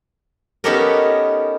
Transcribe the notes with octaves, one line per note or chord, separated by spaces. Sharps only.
B3 C#4 D#4 G4 A4 A#4